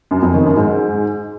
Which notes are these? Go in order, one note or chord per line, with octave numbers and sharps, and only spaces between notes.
F#2
F2
D#3
F#2
G#2